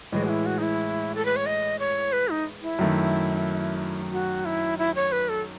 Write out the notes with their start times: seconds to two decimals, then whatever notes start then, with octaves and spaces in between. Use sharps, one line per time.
0.12 A2 E3 G#3 D#5
0.24 F#4
0.29 E4
0.46 F#4
0.58 D#4
0.62 E4
1.15 A4
1.25 B4
1.36 C#5
1.46 D#5
1.79 C#5
2.13 B4
2.29 D#4
2.62 E4
2.79 F#2 D#3 A3
4.12 F#4
4.45 E4
4.79 E4
4.95 C#5
5.12 B4
5.29 A4